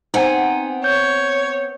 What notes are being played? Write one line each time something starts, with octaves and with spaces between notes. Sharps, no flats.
B3 C4 D#4 F#5 G#5
C#5 G6